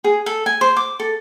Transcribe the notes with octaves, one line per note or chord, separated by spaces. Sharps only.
G#4
A4
G#5
C5
D6
A4